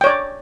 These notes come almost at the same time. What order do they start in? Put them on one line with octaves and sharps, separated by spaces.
G5 C#5 D5